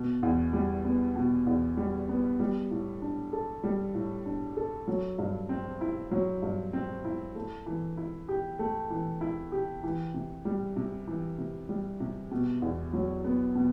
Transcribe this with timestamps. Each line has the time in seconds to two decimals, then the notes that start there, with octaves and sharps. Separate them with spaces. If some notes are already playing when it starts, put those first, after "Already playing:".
Already playing: B2
0.23 E2
0.53 G3
0.85 B3
1.16 B2
1.47 E2
1.77 G3
2.09 B3
2.40 G3
2.71 A2
3.02 D4
3.33 A4
3.63 G3
3.94 A2
4.25 D4
4.57 A4
4.88 F#3
5.19 G2
5.49 C4
5.81 E4
6.11 F#3
6.42 G2
6.73 C4
7.05 E4
7.35 A3
7.66 E3
7.97 E4
8.29 G4
8.59 A3
8.90 E3
9.21 E4
9.52 G4
9.83 E3
10.14 C3
10.45 G3
10.76 C3
11.07 E3
11.38 C3
11.69 G3
12.00 C3
12.31 B2
12.62 E2
12.93 F#3
13.24 B3
13.55 B2